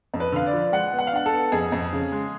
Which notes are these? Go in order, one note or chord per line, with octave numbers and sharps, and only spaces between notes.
F2
B4
D3 F5
D5
F3
G#3 F#5
B3
F#5
F5
D4 F#5
A4
B3
F2 G#4
F2
C#3
G#3